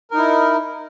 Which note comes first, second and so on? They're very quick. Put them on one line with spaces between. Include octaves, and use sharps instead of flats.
A#4 D#4 E4